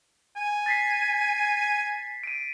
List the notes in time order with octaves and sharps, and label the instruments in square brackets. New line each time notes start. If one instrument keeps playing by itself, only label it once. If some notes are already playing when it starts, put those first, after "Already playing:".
[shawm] G#5
[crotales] A6 B6 C7
D7 D#7